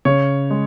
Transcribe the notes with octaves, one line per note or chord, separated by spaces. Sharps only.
C#3 C#5
G#3